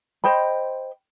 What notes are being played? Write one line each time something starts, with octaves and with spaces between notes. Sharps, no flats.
C5 D#5 G5 B5